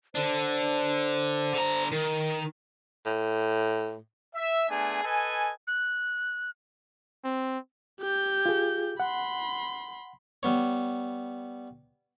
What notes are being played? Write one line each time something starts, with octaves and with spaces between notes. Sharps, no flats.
D3 D4 C5
D3 A#5
D#3 A#4
A2
E5
A3 B3 D4 G#4 G#5
A4 B4 D#5 G#5
F#6
C4
G4 G6
F4 G#4
F#5 B5 C6
G3 B3 C#5